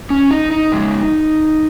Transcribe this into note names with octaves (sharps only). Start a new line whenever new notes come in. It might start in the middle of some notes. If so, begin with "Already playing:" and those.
C#4
D#4
D#4
C#3 G#3